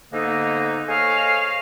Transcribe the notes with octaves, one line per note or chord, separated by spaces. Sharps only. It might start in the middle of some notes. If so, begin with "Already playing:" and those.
G#2 D3 A#3 B3 D#4
G#4 A4 C5 C#5 D#5 F5